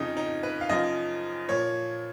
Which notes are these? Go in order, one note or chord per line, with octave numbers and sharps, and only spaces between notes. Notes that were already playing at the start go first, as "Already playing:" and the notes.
Already playing: F2 C#3 F3 D#4
D#4
B4
F5
F#2 C#3 F3 D#5
A#2 F3 C#5